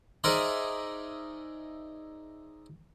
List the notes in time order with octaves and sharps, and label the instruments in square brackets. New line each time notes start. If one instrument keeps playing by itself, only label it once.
[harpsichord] D#4 G#4 A#4 C5 D5 E5